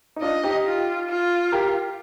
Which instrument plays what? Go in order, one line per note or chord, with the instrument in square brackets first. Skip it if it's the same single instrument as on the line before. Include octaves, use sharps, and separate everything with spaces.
[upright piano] D#4
[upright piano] D4 F4 [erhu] D#5
[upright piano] D#4 G4
[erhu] F4
F4
[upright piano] G4 A#4